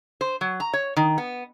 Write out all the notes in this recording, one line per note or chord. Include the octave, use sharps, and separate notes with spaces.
C5
F#3
A#5
C#5
D#3
B3